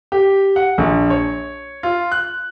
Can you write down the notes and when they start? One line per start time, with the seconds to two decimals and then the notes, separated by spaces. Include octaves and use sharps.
0.12 G4
0.56 F#5
0.78 A#1
1.10 C#5
1.83 F4
2.12 F#6